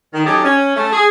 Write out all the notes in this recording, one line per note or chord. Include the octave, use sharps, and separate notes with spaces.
D#3
F#3 C#4 D#4 G4 A4 D#5
C#4
A3
G#4